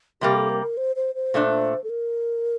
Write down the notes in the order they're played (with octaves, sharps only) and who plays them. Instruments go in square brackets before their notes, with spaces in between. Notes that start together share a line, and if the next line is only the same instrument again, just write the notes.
[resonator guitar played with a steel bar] C3 G3 A#3 [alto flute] G4
[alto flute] A4
A#4
A#4
C5
C5
C5
[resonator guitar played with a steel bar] A#2 A3 D4
[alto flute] A4
A#4